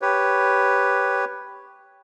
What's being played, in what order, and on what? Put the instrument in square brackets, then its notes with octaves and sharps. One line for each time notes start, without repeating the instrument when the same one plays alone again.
[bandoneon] G4 B4 C#5